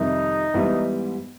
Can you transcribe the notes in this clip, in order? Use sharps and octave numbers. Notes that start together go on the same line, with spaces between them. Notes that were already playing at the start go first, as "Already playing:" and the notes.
Already playing: F2 C3 D#3 G3 D#4
G#2 E3 G3 B3